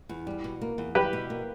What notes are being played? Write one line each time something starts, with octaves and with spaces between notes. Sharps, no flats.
E2
G3
B2
A#3
E2
G3 G4 B4
B2
A#3